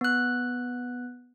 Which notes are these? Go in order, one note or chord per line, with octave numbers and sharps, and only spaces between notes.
B3 F#6